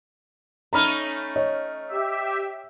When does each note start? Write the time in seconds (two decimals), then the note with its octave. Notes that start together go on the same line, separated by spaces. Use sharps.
0.73 A3 C#4 D#4 A#5 B5 F6
1.36 C#5 D#5
1.88 G4 E5